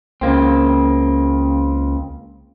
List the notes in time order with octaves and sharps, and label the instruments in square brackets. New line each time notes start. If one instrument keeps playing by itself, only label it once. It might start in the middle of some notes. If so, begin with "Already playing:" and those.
[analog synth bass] C#2 [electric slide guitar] C#3 A#3 C4